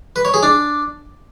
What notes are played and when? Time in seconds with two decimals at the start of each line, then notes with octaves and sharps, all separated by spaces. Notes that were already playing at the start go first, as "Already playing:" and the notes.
0.16 B4
0.25 C#5
0.34 G#4
0.43 D4